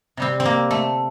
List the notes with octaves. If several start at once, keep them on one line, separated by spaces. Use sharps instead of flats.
C3 G3 C4
C4
A#3
A3